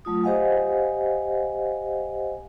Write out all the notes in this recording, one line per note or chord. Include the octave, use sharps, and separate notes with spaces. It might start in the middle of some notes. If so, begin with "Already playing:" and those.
F#3 A3 F4 D#6
G4 C5 D#5 F5 F#5 G#5